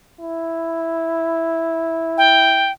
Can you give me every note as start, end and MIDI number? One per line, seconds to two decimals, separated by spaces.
0.20 2.71 64
2.18 2.72 79